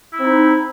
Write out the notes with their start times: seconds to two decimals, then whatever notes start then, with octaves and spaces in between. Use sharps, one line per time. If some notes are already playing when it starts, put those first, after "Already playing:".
0.14 E4
0.19 C4
0.24 D#4